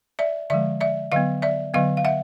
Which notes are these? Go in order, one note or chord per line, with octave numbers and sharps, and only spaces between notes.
D5 E5
D3 F3 G#3 D5 E5
D5 E5
D3 F#3 B3 D#5 F5
D5 E5
D3 F#3 B3 D#5 F5
F5
E5 F#5